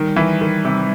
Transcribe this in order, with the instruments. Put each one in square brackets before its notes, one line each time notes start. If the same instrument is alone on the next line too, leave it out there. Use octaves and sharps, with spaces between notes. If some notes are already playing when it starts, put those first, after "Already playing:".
Already playing: [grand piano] D#3 [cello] G3
[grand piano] E3
D#3
C3